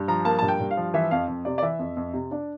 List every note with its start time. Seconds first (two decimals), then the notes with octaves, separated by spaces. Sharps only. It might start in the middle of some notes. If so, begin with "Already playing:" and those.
Already playing: G2
0.08 F3 A#5
0.25 A#3 A5
0.39 G2 A5
0.48 G5
0.60 G2
0.71 F5
0.77 F3
0.94 E3 E5
1.11 F2 F5
1.28 F2
1.45 C3 D5
1.58 D5
1.62 E3 E5
1.79 F2
1.97 F2
2.14 C3
2.31 D4 D5